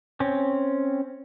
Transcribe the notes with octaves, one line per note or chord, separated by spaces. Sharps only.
C4 C#4